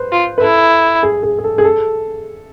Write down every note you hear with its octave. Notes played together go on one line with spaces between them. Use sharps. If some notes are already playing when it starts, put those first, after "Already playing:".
Already playing: B4 C5
F4
B4
E4 A4
G#4
G#4
G#4
A4
G#4
A4